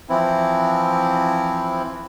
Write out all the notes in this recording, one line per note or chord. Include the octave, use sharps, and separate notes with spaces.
E3 F3 C4 E4